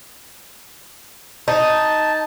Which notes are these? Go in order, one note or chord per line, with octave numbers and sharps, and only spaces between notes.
D#4 A5